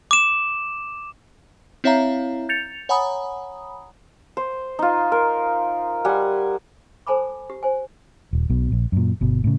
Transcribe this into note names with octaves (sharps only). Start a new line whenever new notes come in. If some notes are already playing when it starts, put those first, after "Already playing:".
D6 E7
C4 E4 C#5 E5 F5 A#5
G6 A6 C#7 F7
C#5 F#5 G#5 A#5 B5 D#6
C5
D#4 F4
A#4
G3 F#5 G#5
A4 C5 G#5 A5 B5 D6
G4
C5 G#5
D#1
B1 B2
A#1
F#2 A#2
G1 B2
A2 C#3